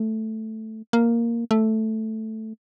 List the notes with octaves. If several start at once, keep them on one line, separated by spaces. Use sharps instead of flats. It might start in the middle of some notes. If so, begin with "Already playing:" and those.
Already playing: A3
A#3
A3